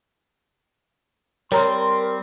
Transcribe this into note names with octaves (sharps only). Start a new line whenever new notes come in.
G3 C4 A#4 C#5 A#5 C6